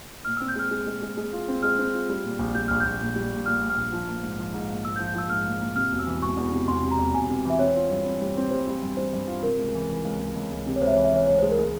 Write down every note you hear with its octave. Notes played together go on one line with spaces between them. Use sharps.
A#2 F6
C4 E6
G6
G#3 F6
G#3
G#3
G#3
G#3
F4
C4
G#3 F6
C4
F4
G3
A#2
A#1
G3 G6
A#1 F6
A#1 G6
A#2
G3
A#2
A#2 F6
A#2
F6
A#1
F3
A#3
G#2
F3
G#2
A#3
G#2 E6
G6
F3
G6
F3 E6
G#2 F6
A#3
A#3
C3 F6
E1
E6
E3
E1 C#6
E2
C3
E2 C6
C3
A#5
E2
E1 G#5
C3
E3 E5
C4 C#5
F4
G2
C4
G3
C4
G3 C5
G3
G2
G3 C5
G2
F4
C3 A#4
C#2
E3
E3
C#2
C#2
C#2
C#2
C3
C#5
C#2 C5
E5
E3 C#5
E5
E3 C#5
C#2 C#5
G#3 C5
A#4
G#3